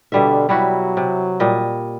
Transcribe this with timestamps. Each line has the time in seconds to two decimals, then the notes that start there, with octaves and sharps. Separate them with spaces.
0.12 B2 D3 G3 E5
0.49 F#3 G3 E4 F#4
0.97 C3
1.40 A#2 G3 D#5